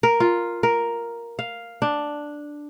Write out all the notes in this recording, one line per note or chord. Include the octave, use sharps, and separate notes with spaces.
A#4
F4
A#4
F5
D4